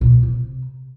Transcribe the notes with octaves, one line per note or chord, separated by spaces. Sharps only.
B2
E3
C3